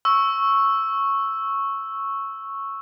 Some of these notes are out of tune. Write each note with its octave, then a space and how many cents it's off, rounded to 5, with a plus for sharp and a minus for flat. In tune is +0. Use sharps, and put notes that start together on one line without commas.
C#6 -5 E6 +0